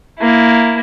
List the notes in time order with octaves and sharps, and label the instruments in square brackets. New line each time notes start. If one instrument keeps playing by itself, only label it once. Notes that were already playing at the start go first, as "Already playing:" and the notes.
[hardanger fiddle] A#3 E4